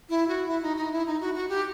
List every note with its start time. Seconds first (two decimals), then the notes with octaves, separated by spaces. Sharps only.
0.10 E4
0.28 F#4
0.48 E4
0.63 D#4
0.77 D#4
0.92 E4
1.06 D#4
1.20 F#4
1.35 F#4
1.49 G4